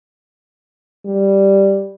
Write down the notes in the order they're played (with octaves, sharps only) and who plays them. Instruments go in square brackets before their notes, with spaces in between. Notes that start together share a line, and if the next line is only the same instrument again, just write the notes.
[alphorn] G3